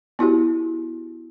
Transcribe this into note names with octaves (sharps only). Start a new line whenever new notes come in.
B3 E4 F#4 G4